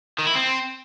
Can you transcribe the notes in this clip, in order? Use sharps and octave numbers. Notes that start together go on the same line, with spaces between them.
D#3
E4
C4